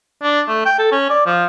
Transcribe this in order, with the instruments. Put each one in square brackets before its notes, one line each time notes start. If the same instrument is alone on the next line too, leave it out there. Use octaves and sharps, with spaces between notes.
[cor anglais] D4
A3
G5
A4
C#4
D5
F3